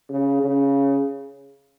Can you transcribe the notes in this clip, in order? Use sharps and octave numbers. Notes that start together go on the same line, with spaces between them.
C#3
C#3